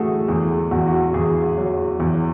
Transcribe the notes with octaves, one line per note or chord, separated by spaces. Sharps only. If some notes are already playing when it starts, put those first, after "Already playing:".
Already playing: A2 E3 A3 F#4 G#4 A4
E2 G#4
E2 F#4
F#4
E2 G#4
F#3
E2